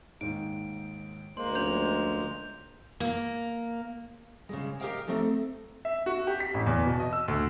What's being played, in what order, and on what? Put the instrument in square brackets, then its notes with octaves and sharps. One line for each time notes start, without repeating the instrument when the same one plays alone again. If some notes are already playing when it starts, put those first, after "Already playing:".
[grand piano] D#2 G#2 [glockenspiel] D7
[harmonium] D2 [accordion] G#3 A#3 [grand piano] C5 [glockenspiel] C6
[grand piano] F3 C#4 A#4 [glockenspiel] G6 F7
[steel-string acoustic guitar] A#3
C#3 G3 G#3
G4 G#4 A#4 D#5 F5 G5
A3 C4 D#4 A4
[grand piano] E5
F#4
G4
B6
A1
E2
B2
D#5
E6
D2